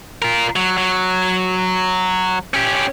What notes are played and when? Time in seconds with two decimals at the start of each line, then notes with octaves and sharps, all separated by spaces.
0.22 F4 A#4
0.56 F#3
0.78 F#3
2.54 C#4 G4